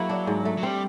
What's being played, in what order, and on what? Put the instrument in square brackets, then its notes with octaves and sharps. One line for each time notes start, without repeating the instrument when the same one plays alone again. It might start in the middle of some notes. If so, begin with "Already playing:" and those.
Already playing: [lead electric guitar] F#3 [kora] A#3 E4 G#4
[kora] D4
G#2
A3
[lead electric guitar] F#3
[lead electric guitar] G3 [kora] C4